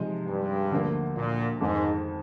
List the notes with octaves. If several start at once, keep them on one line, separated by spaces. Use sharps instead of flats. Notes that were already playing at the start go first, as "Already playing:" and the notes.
Already playing: C3 F3 G#3 D#4
G2
D2 D3 F3 A#3
A#2
F2 G#2 D#3 G#3